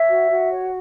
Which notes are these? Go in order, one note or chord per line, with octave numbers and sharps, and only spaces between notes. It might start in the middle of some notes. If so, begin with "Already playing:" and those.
Already playing: C#5 E5
F#4
F#4
C#5